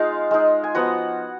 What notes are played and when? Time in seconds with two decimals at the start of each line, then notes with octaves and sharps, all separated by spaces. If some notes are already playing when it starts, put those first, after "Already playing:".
Already playing: G#3 D#4 F4 F5
0.31 G#3 D#4
0.64 G#5
0.75 F3 B3 D#4 F#4 F#5